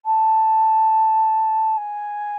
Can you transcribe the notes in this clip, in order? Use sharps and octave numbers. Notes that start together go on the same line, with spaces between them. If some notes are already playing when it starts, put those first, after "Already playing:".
A5
G#5